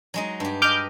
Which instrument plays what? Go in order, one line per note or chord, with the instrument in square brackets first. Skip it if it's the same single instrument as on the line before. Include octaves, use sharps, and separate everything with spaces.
[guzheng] F#3 G#3 D#4
G2 G4
[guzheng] B4 D#5 [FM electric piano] D6 F6 G6